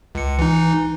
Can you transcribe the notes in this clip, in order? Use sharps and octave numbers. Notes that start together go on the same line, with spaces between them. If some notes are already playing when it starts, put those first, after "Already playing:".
C#2 C#7
E3 D#4